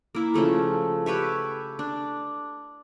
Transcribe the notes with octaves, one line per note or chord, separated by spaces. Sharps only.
A#3 E4
C#3 F3 A3 A4
G4 B4 C#5 E5
D4